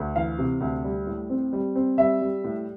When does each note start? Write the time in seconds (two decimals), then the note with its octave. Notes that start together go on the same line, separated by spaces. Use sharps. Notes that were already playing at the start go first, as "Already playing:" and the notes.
Already playing: D2
0.15 E3 F5
0.39 C3
0.61 D2
0.84 G3
1.07 A2
1.30 C4
1.53 G3
1.75 C4
1.98 G3 E5
2.21 G3
2.44 A2